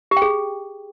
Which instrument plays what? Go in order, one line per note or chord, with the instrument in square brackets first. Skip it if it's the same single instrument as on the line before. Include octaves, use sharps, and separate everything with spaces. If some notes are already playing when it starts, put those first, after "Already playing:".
[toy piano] G4
G5
G#4